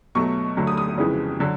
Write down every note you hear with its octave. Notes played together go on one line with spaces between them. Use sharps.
B2 F#3 A3 C#6
D2 D3 F#3 A3
D#6
D#6
F2 C#3 E3 G#3
D3 F#3